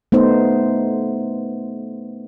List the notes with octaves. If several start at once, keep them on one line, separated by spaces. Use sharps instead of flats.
A3 B3 D#4 C5